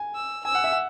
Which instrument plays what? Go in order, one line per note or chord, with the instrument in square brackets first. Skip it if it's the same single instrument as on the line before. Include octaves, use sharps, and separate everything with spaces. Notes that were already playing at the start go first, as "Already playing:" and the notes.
Already playing: [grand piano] G#5
[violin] E6
[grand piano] G#5 [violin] E6
[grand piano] F#5
E5
F#5